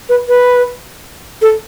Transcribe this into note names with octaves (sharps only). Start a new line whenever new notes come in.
B4
B4
A4